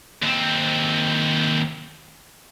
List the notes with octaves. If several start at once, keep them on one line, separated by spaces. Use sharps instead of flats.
D#2 C4